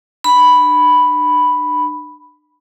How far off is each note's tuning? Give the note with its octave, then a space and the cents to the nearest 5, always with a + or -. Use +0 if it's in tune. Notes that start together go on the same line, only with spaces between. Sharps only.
D4 +40 B5 +0